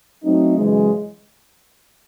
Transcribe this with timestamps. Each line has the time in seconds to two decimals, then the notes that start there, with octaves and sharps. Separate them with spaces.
0.23 F#3 A3 C4 D#4
0.56 F#2 C#3 E3 G#3